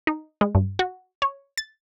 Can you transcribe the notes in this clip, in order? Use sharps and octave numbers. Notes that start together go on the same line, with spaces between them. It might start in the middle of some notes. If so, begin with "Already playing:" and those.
D#4
G#3
G2
F#4
C#5
A6